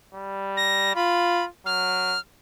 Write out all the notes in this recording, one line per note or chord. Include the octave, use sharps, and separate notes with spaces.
G3
A#6
F4 B5
F#3 F6